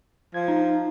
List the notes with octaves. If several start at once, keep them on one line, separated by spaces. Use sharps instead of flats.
F3 G#6
D#4 A#5